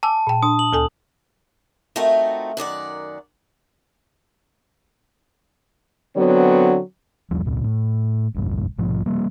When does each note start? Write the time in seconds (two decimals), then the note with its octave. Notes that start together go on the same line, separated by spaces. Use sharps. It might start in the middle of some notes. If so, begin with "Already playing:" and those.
0.03 G#5 A5 D6 E6
0.27 A#2 G5
0.43 D4 D#6
0.59 F#7
0.73 D2 A4 G#5
1.96 A3 C4 D#4 F4 F#4 A#4
2.57 F#2 D#3 D5 F#5
6.16 D3 F#3 B3 C4 C#5
7.31 D#1 E2 F3 G3
7.45 E1 C#2 A#2 C#3
7.64 A2
8.35 F#1 B1 E2 G2
8.78 A#1 G#2 B2 F3
9.06 C3 F3 G3 A#3